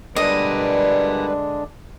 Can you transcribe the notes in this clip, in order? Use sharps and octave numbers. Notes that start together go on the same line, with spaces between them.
D3 G3 G#3 D4 A#4 B4 D5 D#5